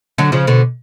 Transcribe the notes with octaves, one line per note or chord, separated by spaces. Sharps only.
D3 F#3
C#3 F3
B2 D3